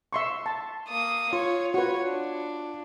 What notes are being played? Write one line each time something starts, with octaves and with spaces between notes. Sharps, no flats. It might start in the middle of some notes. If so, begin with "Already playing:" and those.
E5 C6 C#6
A5
A#3 D#6
F4 C#5
F#4 B4 C#5
D4